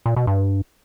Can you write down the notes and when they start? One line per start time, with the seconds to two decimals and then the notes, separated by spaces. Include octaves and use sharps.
0.06 A#2
0.16 B2
0.27 G2